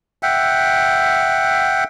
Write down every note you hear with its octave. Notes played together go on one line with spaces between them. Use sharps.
E5 F#5 G5